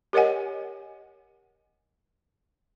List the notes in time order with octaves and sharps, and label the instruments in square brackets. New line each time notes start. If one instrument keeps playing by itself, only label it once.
[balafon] G4 A#4 C#5 D#5 F#5 G#5